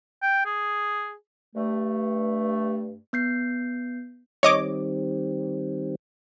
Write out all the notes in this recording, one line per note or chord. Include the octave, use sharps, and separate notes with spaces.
G5
G#4
G2 A3
B3 G6 C7
D#3 G3 C4 C#5 D#5 D6